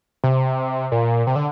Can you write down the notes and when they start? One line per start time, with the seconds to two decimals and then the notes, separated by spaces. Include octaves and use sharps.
0.24 C3
0.92 A#2
1.27 C3
1.36 D3